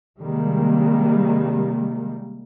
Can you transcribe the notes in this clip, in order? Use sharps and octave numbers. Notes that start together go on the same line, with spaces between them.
C3 D#3 G3 G#3 A#3